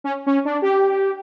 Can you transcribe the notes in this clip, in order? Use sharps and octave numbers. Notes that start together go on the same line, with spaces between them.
C#4
C#4
D4
G4